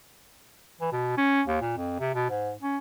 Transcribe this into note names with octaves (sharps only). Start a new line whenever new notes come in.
E3
B2
C#4
D#2
A#2
F2
C3
B2
G#2
C#4